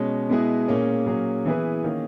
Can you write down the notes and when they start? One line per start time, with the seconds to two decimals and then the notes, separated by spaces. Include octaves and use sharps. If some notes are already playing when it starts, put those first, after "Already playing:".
Already playing: B2 G#3 C#4
0.29 B2 G#3 B3 E4 G#4
0.68 A#2 A#3 C#4 G#4
1.06 A#2 F#3 A#3 C#4 G#4
1.45 E3 B3 E4 G#4 B4
1.84 D#3 A#3 C#4 G#4